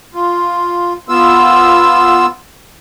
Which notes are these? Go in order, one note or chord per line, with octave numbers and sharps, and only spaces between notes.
F4
B3 F4 E6